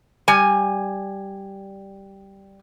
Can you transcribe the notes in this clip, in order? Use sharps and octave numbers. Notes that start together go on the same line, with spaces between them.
G3 G#5